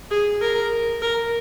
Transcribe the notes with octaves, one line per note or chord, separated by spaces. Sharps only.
G#4
A#4
A#4